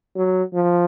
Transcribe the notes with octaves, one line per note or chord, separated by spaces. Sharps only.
F#3
F3